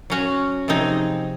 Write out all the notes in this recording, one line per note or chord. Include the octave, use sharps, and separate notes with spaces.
F#3 C#4 F#4
C3 F3 C4 D#4 G#4